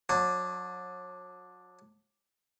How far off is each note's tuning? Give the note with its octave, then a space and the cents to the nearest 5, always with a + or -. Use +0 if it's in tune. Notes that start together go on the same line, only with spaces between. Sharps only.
F#3 -35 D4 +0